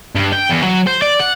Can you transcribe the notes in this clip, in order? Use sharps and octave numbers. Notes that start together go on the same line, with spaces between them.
G2
G5
E2
F#3
C5
D5
F#5